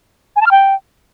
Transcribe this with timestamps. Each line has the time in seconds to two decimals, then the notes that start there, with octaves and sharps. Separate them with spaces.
0.36 G#5
0.41 A5
0.46 F6
0.51 G5